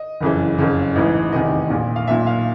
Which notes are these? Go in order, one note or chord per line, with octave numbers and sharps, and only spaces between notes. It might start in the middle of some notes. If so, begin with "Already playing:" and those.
Already playing: D#5
F#1 F2 C#3 E3
F#1 F2 C#3
A1 G#2 E3
F1 E2 C3 D#3 D#5
A#1 A#2
F5
B1 A#2 E5
F5